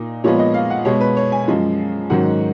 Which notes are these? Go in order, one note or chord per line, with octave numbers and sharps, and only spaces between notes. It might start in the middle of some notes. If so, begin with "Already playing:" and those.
Already playing: A#2 D#4
A#2 F3 G#3 B3 C#5
D#5
F5
F#5
B2 G#3 B3 C#5
B4
C#5
G#5
F#2 F3 G#3
G#2 D#3 F#3 C#4 F#5